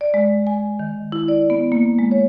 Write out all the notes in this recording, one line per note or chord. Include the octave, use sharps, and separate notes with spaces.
D5
G#3
G#5
D#3
E4
D5
B3
A#3
G#3
C#5